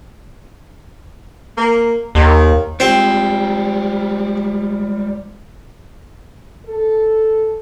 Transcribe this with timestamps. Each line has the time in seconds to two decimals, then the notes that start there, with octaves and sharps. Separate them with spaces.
1.57 A#3
2.15 D#2 D#3
2.80 G3 G#3 C4 F4 C5
6.66 A4